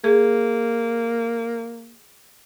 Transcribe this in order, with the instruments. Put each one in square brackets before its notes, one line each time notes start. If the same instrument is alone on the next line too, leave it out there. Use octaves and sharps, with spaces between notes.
[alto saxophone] A#3 [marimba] G#4